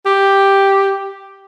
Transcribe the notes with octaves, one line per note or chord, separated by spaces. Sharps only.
G4